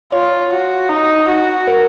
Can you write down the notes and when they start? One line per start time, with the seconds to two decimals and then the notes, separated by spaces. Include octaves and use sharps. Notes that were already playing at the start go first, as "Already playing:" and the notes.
0.12 F4 C#5
0.52 F#4
0.90 D#4
1.29 F#4
1.67 A#4